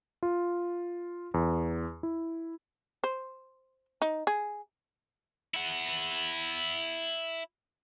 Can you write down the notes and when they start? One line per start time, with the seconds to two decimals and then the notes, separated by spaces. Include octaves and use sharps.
0.23 F4
1.34 E2
2.03 E4
3.04 C5
4.02 D#4
4.27 G#4
5.54 E4 F#5